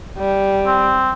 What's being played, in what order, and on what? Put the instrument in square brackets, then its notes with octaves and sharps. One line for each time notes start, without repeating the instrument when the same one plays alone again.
[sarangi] G3
[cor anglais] C4